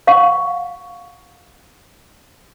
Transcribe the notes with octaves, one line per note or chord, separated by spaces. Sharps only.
F5 F#5 C#6